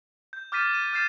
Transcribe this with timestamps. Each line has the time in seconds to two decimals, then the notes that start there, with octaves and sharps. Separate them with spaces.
0.33 G6
0.52 D6 F6 G6 A6 B6 D#7
0.70 F6 D#7
0.93 F6 G6 A6 C7 E7